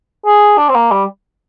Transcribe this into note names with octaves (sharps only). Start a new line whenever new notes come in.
G#4
D4
C4
A#3
G3